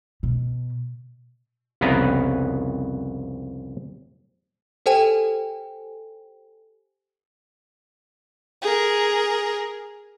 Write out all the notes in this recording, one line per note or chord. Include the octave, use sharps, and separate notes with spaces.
B2
C2 F2 C#3 B3 B4 A#5
G4 A4 C5 G5 G#5
G#4 A#4